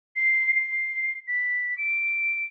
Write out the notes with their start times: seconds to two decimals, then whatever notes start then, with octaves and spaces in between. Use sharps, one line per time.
0.16 C7
0.55 C7
1.28 B6
1.78 D7